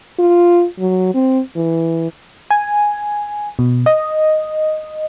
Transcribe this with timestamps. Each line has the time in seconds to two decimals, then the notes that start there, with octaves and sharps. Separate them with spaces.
0.19 F4
0.79 F#3
1.14 C4
1.56 E3
2.50 G#5
3.59 B2
3.86 D#5